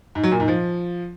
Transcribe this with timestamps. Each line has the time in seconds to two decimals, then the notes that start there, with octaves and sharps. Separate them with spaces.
0.15 G#2
0.23 F#3
0.32 A#2
0.40 G#2
0.48 F3